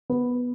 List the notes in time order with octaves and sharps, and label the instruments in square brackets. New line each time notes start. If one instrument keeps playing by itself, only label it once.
[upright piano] B3